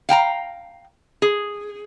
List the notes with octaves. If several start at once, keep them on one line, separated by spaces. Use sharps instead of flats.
F5 G5 A5 A#5
G#4